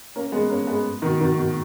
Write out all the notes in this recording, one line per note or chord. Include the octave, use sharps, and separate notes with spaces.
A#3 C#4
G#3 B3
A#3 C#4
G#3 B3
B2 D#3
B2 D#3
B2